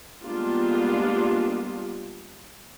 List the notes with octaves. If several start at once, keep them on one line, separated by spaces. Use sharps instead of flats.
G3 G#3 A#3 B3 D4 F4